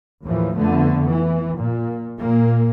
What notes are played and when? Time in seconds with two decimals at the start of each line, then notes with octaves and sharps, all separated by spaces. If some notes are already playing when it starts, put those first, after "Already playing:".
0.24 D#2 A2 E3 F3
0.56 F2 D3 A3 B3
1.07 E3
1.58 A#2
2.17 A#2 A#3